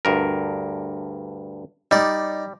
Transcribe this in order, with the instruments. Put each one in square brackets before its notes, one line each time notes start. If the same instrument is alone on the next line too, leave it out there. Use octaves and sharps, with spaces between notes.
[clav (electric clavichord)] D2 G2 A#4
[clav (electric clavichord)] G3 [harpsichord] D#4 D5